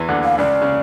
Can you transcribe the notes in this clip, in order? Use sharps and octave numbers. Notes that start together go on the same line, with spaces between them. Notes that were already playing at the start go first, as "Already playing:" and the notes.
Already playing: E2 E3
D2 D3
F5
C#2 C#3 D5
C#3